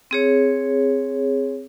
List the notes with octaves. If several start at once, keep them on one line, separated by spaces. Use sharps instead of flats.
C4 G#4 C#5